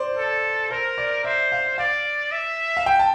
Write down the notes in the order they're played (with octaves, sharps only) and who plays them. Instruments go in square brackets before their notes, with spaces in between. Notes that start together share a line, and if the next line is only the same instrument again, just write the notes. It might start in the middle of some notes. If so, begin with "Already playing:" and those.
Already playing: [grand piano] C5 D5
[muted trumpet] A4
[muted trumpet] A#4 [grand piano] C5
[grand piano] D5
[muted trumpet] C5 [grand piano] E5
[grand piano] F5
[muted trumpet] D5 [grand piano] F5
[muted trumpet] E5
[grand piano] F5
G5
A5